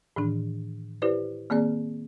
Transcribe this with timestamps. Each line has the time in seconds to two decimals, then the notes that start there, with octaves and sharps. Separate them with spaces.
0.16 A2 D#3 E3 D4
1.02 E4 G4 B4 C5 D5
1.50 D#3 A#3 C4 G#4 D5